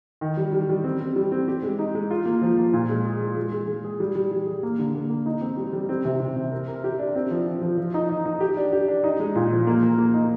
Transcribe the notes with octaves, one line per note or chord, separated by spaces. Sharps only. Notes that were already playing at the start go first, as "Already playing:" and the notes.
D#3
G3
G3
G3
C4
C4
G3
C4
G4
G#3
D#4
G#3
F4
A#3
F3
A#3
A#2
G#3
G#4
G#3
G#3
G#3
G#3
G#4
G3
G3
G3
G#4
A#3
D3
A#3
A#3
D#4
C4
G3
G3
C4
C3
C3
C3
A#4
A#4
G4
D4
C4
F3
F3
F3
F3
D#4
D#4
D#4
G4
D4
G4
D4
D#4
G#3
A#2
F3
A#3
A#4
A#3
D#4